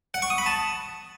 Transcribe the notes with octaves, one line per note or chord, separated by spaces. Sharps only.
F#5
C#6
D#6
B5
A5